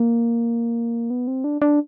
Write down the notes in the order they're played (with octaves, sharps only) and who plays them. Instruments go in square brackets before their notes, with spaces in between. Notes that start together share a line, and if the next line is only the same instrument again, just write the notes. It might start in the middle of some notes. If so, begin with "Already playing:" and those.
Already playing: [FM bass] A#3
B3
C4
D4
D4